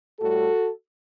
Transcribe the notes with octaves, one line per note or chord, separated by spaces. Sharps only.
A2 G3 F#4 A4